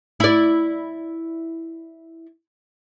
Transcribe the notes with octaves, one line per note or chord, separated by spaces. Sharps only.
E4 D5